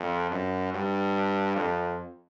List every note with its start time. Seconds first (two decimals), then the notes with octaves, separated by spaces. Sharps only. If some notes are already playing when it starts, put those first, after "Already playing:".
Already playing: F2
0.31 F#2
0.74 G2
1.56 F2